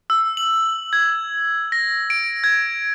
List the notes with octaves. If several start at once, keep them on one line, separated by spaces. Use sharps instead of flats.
E6
F#7
G#6
A#6
D7
G#6